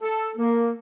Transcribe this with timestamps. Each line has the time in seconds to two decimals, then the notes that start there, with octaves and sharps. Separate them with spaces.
0.02 A4
0.38 A#3